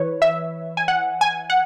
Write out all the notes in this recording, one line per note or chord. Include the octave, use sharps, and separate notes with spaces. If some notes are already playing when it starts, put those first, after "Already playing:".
Already playing: E3 B4 C#5
E5
G#5
F#5
G#5
F#5